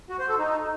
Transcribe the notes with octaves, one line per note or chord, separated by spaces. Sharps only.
F#4
C5
A4
D#4